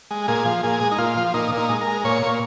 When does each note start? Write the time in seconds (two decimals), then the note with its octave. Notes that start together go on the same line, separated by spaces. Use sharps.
0.11 G#3
0.28 A#2 G#4
0.45 F3
0.63 A#2 G#4
0.81 G#3
0.92 D#4
0.98 A#2 F4
1.17 F3
1.34 A#2 D#4
1.52 A#2
1.57 D#4
1.69 G#3
1.81 A#4
1.87 G#3
2.05 A#2 C#5
2.22 A#2